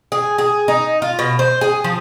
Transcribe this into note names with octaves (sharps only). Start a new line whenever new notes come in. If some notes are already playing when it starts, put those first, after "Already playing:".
G#4
G#4
D#4
F4
B2
C5
G#4
F3